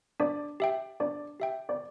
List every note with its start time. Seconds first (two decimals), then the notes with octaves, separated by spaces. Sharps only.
0.20 D4 D5
0.60 G4 E5 G5
1.00 D4 D5
1.40 G4 E5 G5
1.69 D5